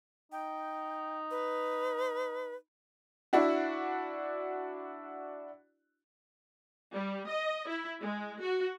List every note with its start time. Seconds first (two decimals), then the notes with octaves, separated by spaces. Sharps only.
0.32 D#4 G5
1.31 B4
3.33 D4 E4 F#4
6.93 G3
7.28 D#5
7.68 E4
8.02 G#3
8.42 F#4